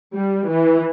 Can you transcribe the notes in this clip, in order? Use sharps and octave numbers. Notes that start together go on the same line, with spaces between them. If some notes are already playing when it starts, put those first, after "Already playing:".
G3
E3